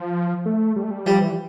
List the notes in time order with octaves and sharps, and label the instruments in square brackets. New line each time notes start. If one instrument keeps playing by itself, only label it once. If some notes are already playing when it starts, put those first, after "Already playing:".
Already playing: [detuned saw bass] F3
A3
G3
A3
G3
[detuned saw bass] F3 [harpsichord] G3
[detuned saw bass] E3